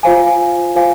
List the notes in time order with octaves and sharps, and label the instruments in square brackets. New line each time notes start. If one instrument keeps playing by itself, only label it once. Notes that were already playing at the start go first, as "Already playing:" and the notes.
[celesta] F4 C5 F5 G#5
F4 C5 F5 G#5